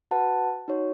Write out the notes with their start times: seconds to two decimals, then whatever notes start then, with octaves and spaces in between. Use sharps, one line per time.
0.11 F#4 B4 F#5 A5
0.68 D#4 F#4 C#5